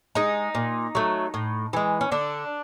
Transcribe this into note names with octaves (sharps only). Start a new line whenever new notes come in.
G#3 D#4
A#2
F#3 A3
A2
E3 G#3
C#4
D3 D4